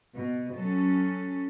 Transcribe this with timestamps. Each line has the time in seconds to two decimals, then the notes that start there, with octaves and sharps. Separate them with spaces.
0.15 B2
0.54 F#3 C#4 A4